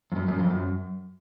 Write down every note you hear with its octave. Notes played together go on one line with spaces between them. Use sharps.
F2
F#2
F#2
F2
F#2